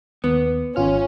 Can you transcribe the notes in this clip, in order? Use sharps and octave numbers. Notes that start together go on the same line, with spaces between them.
D#2 B3
G#1 C#4 F4 F6